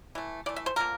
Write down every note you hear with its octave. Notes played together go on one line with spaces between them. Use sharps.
E3 A3
E3 A3 D5
E5
C5
D3 F3 A#3 A#4